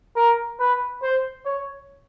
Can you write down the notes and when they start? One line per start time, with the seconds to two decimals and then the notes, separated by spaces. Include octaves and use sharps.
0.16 A#4
0.60 B4
1.02 C5
1.45 C#5